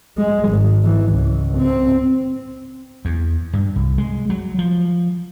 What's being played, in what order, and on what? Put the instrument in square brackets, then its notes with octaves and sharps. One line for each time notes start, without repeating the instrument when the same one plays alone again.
[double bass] G#3
G#1
E3
C#2
C4
[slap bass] E2
G2
C2
G#3
F#3
F3